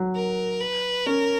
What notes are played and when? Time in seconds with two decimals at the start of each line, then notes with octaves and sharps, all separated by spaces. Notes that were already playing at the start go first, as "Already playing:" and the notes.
Already playing: F#3
0.15 A#4
0.61 B4
1.06 C#4 A#4